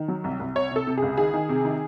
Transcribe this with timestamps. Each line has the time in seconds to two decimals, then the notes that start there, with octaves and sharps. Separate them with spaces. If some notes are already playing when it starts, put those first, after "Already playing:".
Already playing: D#3
0.08 F#3
0.24 C2
0.40 C2
0.55 C3 C#5
0.71 C3 A4
0.87 C3
0.98 C#2 G#4
1.18 D#3 G#4
1.34 D#3
1.49 C3
1.65 D#3